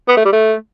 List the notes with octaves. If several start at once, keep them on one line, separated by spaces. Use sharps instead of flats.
B3
A3
G3
A3